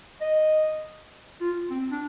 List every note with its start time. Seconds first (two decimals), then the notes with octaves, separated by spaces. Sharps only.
0.21 D#5
1.41 F4
1.71 C4
1.91 D4